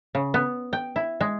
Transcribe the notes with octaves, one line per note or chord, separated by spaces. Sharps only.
C#3
B3
G5
E4
G#3